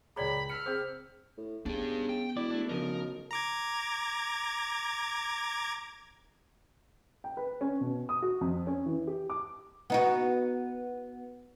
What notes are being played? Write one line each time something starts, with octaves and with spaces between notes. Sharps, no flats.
C#2 G#4 C#5 D5 G5 A#5 B5
E6 F6 B6 C#7
C4 G#4 C5
A2
C#3 B3 D4 G4
G5
E1 E4 D5
A3 D4
B1 C#3 F3 D#4 A#4
A#5 D6 G#6
G5
B4
C#4
B2
D#6
F#4
F2
C#4
E3
G4
D6
B3 D#4 F#4